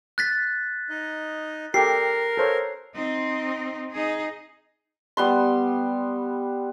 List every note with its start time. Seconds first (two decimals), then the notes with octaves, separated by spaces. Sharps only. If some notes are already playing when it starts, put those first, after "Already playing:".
0.18 F#6 A6 B6
0.90 D#4 D#5
1.74 G4 A4 A#4 C7
2.37 A4 C5 C#5
2.95 C4 D#4
3.92 D#4 G#4
5.17 G3 B3 C6